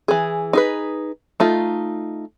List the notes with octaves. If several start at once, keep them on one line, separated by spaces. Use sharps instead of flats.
E3 G#4
D#4 G#4 B4
A3 D#4 F4